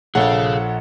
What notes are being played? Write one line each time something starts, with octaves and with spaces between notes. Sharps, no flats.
A#1 G#4 A4 C#5 F5 F#5